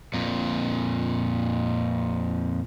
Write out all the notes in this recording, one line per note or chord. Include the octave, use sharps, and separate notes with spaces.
F2 A#2